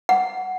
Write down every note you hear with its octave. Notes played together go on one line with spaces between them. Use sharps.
F#5